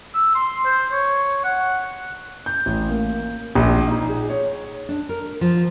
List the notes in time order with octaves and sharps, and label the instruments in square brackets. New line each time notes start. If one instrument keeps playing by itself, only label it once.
[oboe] E6
C6
C5
C#5
F#5
[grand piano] G6
A1
A#3
A#1
D#4
G#4
C#5
[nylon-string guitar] D4
A#4
F3